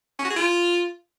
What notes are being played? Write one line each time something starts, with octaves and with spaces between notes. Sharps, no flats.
C#4
F#4
G#4
F4